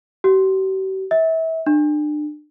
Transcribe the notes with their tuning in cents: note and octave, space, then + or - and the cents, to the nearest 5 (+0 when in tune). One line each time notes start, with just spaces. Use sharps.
G4 -45
E5 -30
D4 +35